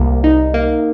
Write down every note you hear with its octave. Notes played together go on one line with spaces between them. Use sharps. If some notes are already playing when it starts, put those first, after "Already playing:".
Already playing: C2 A#3
D#4
A#3